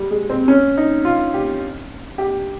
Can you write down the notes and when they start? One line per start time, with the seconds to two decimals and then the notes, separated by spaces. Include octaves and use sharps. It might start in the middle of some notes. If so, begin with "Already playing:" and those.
Already playing: G3
0.11 G#3
0.30 C4
0.48 C#4
0.77 D#4
1.05 F4
1.34 G4
2.18 G4